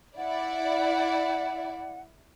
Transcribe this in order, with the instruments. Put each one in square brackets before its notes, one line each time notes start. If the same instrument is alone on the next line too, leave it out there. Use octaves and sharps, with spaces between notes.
[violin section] E4 D5 [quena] F#5